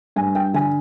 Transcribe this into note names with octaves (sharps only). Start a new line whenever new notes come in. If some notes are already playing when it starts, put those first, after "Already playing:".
G2 G#5
G5
D3 G#5